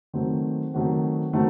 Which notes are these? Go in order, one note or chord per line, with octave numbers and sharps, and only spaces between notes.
D#3 F#3 A3 C4 F#4
D#3 F#3 A3 C4 F#4
D#3 F#3 A3 C4 F#4